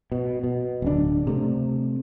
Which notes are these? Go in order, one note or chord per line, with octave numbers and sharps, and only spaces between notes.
B2
B2
D1 C#3 D4
C3 A3